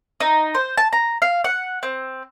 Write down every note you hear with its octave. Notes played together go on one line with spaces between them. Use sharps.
D#4
C5
A5
A#5
F5
F#5
C4